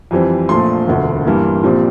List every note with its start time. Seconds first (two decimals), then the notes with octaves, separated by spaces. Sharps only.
0.11 F2 E3 G3 C4
0.49 A#1 A#2 F3 A3 C6
0.87 E1 D2 D3
1.25 G2 E3 A#3
1.63 A#1 A#2 G3 C4